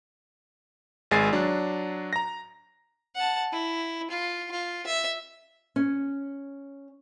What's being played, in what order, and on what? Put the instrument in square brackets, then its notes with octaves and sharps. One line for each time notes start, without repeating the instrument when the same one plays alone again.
[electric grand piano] G#1 G#3 G#5 A6 C7
F#3 D4
A#5 A#6
[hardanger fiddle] F#5 A5
E4
F4
F4
E5
[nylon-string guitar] C#4